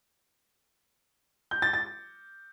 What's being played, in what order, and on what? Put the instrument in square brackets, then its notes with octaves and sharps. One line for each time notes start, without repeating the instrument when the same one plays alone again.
[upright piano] G6
A6
A6